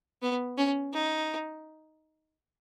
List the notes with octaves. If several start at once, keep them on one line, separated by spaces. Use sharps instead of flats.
B3
C#4
D#4